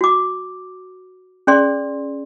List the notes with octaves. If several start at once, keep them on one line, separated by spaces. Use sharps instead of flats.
F#4 D6
C#4 G#4 D5 C6